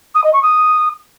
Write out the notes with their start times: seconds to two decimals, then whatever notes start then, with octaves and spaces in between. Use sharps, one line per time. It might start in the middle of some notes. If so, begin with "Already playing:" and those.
0.14 D#6
0.23 D#5
0.33 C#6
0.42 D#6